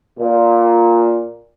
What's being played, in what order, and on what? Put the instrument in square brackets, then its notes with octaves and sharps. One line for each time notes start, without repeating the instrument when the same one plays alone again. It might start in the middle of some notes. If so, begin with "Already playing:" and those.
[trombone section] A#2